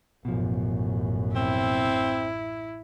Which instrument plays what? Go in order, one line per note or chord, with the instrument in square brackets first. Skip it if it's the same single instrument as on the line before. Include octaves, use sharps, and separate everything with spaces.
[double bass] A1 F#2 [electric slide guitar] B2 F3
[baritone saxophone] C4 [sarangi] E4